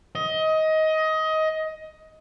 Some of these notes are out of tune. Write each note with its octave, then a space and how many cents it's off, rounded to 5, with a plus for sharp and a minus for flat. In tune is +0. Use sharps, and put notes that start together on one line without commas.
D#5 +20